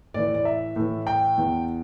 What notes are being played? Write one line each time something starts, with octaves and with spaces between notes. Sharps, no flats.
A2 E3 D5
D5
E5
A2 E3
G5
E2 E3